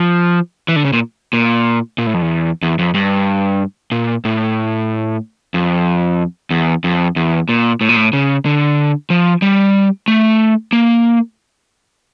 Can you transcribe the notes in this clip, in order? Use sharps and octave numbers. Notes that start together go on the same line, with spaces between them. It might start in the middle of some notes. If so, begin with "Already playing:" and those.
Already playing: F3
E3
D3
C#3
A#2
A#2
A#2
A2
F2
E2
E2
F2
G2
A#2
A2
F2
E2
F2
E2
A#2
A2
A#2
A2
C#3
D3
F3
G3
A3
A#3